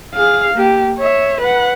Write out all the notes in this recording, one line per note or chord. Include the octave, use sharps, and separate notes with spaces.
G#4 F5
A#3 G4
C#5 E5
B4 F#5